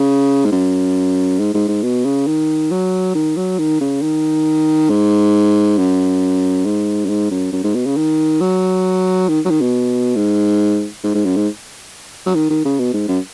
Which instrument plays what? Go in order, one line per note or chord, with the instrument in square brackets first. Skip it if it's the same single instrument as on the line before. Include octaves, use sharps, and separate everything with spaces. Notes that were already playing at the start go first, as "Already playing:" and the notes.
Already playing: [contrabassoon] C#3
G#2
F#2
G#2
G#2
G#2
B2
C#3
D#3
F#3
D#3
F#3
D#3
C#3
D#3
G#2
F#2
G#2
F#2
G#2
F#2
F#2
G#2
B2
C#3
D#3
F#3
D#3
F#3
D#3
B2
G#2
G#2
G#2
F#2
G#2
F#3
D#3
D#3
C#3
B2
G#2
F#2